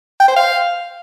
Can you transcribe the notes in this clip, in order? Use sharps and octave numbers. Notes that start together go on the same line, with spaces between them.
G5
C5
F5